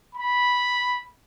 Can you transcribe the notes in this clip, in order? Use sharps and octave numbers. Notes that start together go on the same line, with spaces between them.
B5